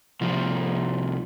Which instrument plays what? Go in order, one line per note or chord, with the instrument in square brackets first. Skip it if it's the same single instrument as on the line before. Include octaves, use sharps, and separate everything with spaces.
[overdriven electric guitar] C2 F3